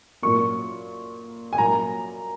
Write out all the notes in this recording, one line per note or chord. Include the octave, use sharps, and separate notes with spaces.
A#2 F#3 A#3 C#6
G#5
A#2 F#3 A#3 A#5